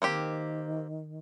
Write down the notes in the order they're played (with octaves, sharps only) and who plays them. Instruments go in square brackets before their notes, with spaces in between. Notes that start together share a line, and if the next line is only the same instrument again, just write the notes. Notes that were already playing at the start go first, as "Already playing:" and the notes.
[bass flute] D#3 [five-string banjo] A#3 C4 G4